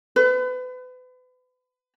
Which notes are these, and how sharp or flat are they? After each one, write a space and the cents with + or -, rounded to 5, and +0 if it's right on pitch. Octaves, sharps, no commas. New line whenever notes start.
B4 +35